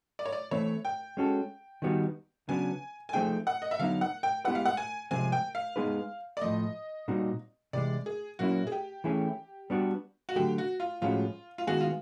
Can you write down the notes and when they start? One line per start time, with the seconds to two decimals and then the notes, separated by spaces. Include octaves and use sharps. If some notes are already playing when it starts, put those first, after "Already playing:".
0.19 D5
0.26 C#5
0.33 D5
0.51 E3 A3 C4 C#5
0.85 G5
1.17 G#3 C#4 F#4 A4
1.82 D#3 G3 B3 D#4 F#4
2.48 C#3 F#3 B3 D4 G#5
3.09 G#5
3.13 F3 A3 C4 D#4 G#4 G5
3.47 F#5
3.62 D#5
3.71 E5
3.79 D3 F#3 B3 D#4 F5
4.01 F#5
4.23 G5
4.45 G#3 B3 E4 G4 B4 F#5
4.55 F5
4.65 F#5
4.77 G#5
5.11 C3 F3 G#3 C4 G#5
5.32 G5
5.55 F5
5.76 G#3 B3 D#4 G#4 B4
6.37 D5
6.41 A2 F3 A3 D#5
7.08 A#2 G3 C4 D#4 F#4
7.73 C3 E3 G#3 D5
8.06 G#4
8.39 A#2 F#3 A#3 C#4 E4 F#4
8.67 G#4
8.72 G4
9.04 E3 A3 C#4 E4 G#4
9.70 G3 B3 D4 F#4
10.29 F#4
10.36 D3 F#3 A3 G4
10.58 F#4
10.80 F4
11.02 A2 F3 G#3 C#4 F4 F#4
11.58 F4
11.67 D#3 G#3 B3 E4 F#4 G#4
11.81 F4